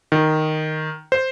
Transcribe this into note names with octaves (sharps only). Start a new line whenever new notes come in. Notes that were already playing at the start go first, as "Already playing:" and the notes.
D#3
C5